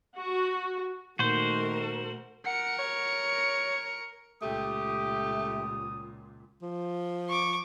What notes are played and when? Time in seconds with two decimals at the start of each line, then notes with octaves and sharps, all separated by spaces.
0.17 F#4
1.19 A#2 D#3 A3 F#4 A#4 C5
2.46 A#4 F#5 C#7
2.79 C#5
4.42 C#2 A#2 A3 G4 D#6
6.62 F3
7.29 C#6 D6